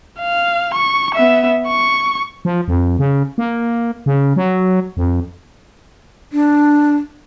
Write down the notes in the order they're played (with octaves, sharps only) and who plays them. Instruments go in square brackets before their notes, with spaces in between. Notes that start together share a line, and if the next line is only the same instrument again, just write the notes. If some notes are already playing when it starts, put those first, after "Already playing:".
[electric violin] F5
C#6
B3 E5
C#6
[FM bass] F3
F2
C#3
A#3
C#3
F#3
F2
[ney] D4